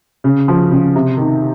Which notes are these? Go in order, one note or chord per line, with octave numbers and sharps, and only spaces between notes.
C#3
F3
C#3
C3
D#3